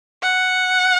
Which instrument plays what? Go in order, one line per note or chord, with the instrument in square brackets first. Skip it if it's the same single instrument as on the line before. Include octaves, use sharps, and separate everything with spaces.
[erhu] F#5